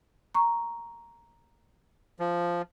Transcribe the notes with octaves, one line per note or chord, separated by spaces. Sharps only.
A#5 C#6
F3